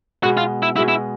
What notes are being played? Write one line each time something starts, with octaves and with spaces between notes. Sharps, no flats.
B2 G#3 B3 F#4
F4
E4
B2 G#3 B3 E4
E4